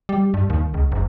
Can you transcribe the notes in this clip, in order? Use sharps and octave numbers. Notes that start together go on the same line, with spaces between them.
G3
G2
D#2
C#2
F#1